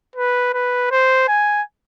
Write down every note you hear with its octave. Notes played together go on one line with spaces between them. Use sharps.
B4
B4
C5
G#5